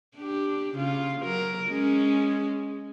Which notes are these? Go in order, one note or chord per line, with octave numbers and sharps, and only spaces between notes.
D4 G4
C#3 F4
F#3 A#4
G#3 C#4